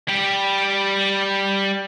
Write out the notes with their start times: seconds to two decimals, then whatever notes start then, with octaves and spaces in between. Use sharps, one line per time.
0.08 G3 G4